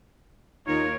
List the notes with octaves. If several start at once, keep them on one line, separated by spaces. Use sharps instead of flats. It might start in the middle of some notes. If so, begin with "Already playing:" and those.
D#2 D#4 F4 A#4 C#5